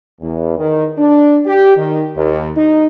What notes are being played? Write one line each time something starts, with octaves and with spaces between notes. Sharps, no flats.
E2
D#3
D4
G4
D#3
D#2
D#4